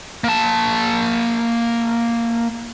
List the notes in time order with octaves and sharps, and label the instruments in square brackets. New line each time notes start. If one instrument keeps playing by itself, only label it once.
[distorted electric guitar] A#3 A5